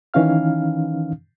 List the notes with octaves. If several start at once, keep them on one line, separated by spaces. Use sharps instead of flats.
D#3 E3 C#4 D#4 F5 F6